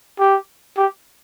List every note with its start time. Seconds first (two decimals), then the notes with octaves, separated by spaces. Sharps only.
0.19 G4
0.77 G4